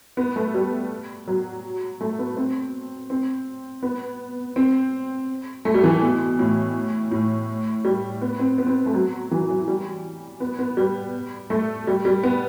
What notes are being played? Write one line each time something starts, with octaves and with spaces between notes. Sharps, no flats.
B3
A3
G3
F#3
A3
B3
C4
C4
B3
C4
A3
G3
E3
B2
A2
A2
G3
B3
C4
B3
C4
A3
F#3
E3
F#3
G3
B3
B3
G3
A3
G3
G3
B3